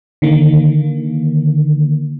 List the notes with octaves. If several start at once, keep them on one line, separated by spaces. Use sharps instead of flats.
D3 D#3 A#3